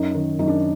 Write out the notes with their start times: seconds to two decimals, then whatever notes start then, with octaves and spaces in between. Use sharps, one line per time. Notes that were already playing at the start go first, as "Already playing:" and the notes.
Already playing: F#2 D#4
0.15 D#3
0.39 F#2 D#4
0.48 D4